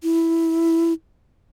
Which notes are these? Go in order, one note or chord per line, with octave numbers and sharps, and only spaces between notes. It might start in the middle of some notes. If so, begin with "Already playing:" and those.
E4